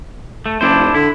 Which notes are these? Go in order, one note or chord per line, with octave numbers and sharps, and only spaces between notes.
A3
F#1 D4 E4 C5
F1
D3 E4